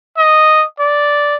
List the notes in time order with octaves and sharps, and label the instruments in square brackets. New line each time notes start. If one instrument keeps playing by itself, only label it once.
[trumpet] D#5
D5